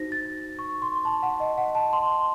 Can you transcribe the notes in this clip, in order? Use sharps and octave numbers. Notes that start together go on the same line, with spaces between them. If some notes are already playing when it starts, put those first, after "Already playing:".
Already playing: D#4 F#4 C5 A#6
A6
C#6
C6
A5
F#5
D#5
F#5
A5
C6
C6